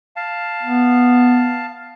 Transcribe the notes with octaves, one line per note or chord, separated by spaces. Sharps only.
F5 A5
B3